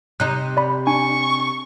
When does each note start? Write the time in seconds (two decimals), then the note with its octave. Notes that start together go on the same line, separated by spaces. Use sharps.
0.20 C3 D#4 F#6
0.57 D5 B5
0.87 D4 G#5 C#6